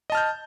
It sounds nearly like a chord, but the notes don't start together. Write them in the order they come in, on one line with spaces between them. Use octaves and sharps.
D#5 A5 F6 G6